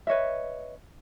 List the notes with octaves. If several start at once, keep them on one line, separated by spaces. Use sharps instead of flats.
B4 C#5 D#5 E5